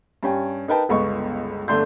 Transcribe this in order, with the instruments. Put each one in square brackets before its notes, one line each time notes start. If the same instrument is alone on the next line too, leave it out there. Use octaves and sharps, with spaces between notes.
[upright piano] G2 C#4 G5
D#4 A#4 B4 G5 A5
G1 C#2 B3 D#5 C#6
G1 D3 A3 D4 C6 G6